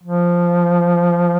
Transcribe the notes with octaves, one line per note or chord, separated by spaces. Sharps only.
F3